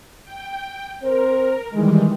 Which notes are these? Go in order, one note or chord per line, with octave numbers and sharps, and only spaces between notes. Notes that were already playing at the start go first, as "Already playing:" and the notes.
G5
C4 A#4 C5
D#3 E3 G3 G#3